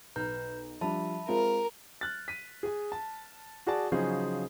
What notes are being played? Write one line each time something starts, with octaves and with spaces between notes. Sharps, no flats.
B1 B4 A#5 G6
F3 G3 D4 E5 A5 B5
G#3 C4 F4 A#4
F6 F#6 A6
B6 D#7
G#4 G#5
A5
F#4 G#4 D5 A5
C#3 F3 F#3 D#4 G#4 C5